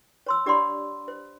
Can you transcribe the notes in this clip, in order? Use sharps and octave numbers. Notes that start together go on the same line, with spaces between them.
C#5 C6 E6
D4 G4 D5 F#5 B5 C6
C5